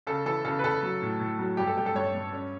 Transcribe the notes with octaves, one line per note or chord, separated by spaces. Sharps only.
C#3 A4
E3 A4
C#3 A4
B4
C#3 A4
F#3
A2
A2
F#3
G2 G4
A4
G2 G4
A4
G2 C#5
G2
C#4